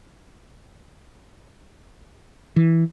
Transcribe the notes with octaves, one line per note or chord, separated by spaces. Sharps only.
E3